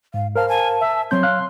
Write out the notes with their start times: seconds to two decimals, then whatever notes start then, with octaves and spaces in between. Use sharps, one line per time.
0.14 G#2 F5
0.36 A#4 C5 F5 A5 F6
0.49 G#5 A5
0.80 E5
1.11 F#3 C4 C#5 C6 G6
1.23 F5 F6 F#6